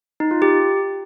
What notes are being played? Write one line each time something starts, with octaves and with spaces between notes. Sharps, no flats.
D#4
F4
G4